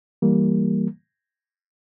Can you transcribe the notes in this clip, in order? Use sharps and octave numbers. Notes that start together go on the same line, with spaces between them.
E3 G3 A#3